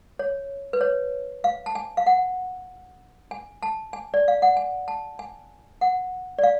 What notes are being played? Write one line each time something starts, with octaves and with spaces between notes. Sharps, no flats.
C#5
B4
C#5
F5
A5
G#5
F5
F#5
G#5
A5
G#5
D5
F5
F#5
G#5
A5
G#5
F#5
D5
F5